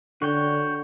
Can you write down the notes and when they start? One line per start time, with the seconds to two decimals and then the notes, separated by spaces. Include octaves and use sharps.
0.22 D3 F#4 C#5 G5